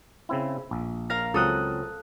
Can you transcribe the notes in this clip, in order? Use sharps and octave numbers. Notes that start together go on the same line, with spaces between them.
C#3 C4 E4
A#1
A#4 F5 A#6
C#2 F#3 C4 A4 D#6 F#6